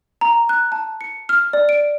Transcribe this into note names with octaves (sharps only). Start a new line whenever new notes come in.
A#5
F#6
A5
C#7
F6
D5
D7